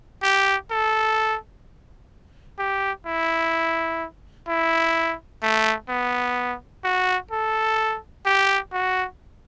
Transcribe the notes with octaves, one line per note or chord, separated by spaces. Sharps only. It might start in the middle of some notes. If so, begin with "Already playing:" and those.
G4
A4
G4
E4
E4
A3
B3
F#4
A4
G4
F#4